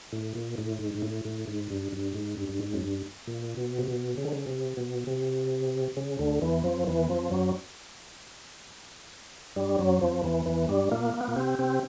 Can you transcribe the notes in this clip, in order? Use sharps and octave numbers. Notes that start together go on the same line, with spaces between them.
A2
A#2
A2
G#2
G#2
A2
A2
G#2
G2
G2
G#2
G2
G2
G#2
F#2
G2
A#2
B2
C3
B2
C#3
D3
C#3
C3
B2
C3
C#3
D2 D3
E2 E3
F2 F3
E2 E3
F2 F3
F#2 F#3
G2 G3
F#2 F#3
F2 F3
E2 E3
E2 E3
G2 G3
A#2 A#3
A#3
B3
A#2 A#3
C3 C4
C3 C4